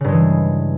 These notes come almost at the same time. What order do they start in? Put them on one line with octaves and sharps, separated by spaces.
C#3 G2 G#3 E3